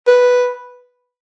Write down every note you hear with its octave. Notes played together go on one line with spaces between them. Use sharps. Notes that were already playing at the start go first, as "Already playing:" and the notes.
B4